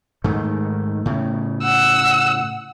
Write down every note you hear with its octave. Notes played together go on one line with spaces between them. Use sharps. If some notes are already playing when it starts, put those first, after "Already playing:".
G#2 D#3 A3
A2 C#3
F#5 E6